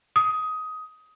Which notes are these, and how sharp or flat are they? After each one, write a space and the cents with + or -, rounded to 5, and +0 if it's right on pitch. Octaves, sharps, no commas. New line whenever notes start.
D#6 +15